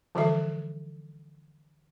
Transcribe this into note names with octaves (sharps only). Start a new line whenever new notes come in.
D3 E3 F3 G3 A4 E5